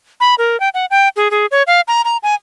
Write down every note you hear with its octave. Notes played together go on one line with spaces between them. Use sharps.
B5
A#4
G5
F#5
G5
G#4
G#4
C#5
F5
A#5
A#5
G#5